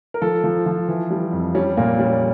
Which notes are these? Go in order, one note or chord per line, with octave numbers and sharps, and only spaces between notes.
A#4
F3 A4
F3
F3
E3
G3
F2
G3 C#4
A#2 A#3
G3 C#4